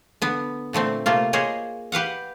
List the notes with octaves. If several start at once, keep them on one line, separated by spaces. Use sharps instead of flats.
D3 B3
A#2 D3 A3 C4
C3 A3 A#3 F4
A#3 G#4 C5 C#5 D#5
G4 B4 F5 F#5